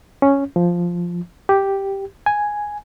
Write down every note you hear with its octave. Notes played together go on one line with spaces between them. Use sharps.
C#4
F3
G4
G#5